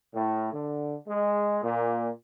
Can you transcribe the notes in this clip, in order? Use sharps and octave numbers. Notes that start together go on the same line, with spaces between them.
A2
D3
G#3
A#2